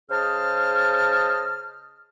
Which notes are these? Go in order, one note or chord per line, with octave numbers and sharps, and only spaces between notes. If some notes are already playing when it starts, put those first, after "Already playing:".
C#3 G#4 C5 D#5 A5 F6